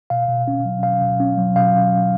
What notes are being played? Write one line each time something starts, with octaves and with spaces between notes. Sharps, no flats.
B2 F5
B2
C#4
F#3
B2 F5
B2
C#4
F#3
B2 F5